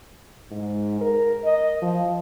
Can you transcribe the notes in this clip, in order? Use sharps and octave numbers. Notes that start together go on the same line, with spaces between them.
G#2
A#4
D#5
F3